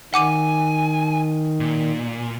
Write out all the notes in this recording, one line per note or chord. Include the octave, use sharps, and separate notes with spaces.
D#3 F#5 G#5 D6 D#7
A#2